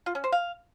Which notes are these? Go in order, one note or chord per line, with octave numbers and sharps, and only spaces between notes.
F4
C#4
C5
F5